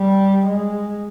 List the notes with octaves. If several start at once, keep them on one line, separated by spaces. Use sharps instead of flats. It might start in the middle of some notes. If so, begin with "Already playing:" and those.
Already playing: G3
G#3